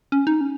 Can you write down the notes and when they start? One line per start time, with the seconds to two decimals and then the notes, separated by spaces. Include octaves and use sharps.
0.12 C#4
0.27 D#4
0.41 C#4